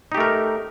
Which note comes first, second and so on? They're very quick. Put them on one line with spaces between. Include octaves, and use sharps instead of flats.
D#4 G4 A3 A#4